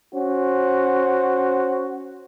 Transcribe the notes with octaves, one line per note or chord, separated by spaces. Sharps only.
C#4 F#4 C5